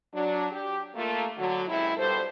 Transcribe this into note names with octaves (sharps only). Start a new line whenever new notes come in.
F#3 D4
G4
A3 A#3 F4
D3 F#3
F#2 C3 G#3 E4
G2 B2 G3 A4 C5